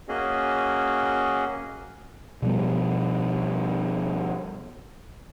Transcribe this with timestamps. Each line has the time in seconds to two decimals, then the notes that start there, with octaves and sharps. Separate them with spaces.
0.09 A#3 C#4 F#4 G#4 D#5
2.42 B2 F3 G3 B3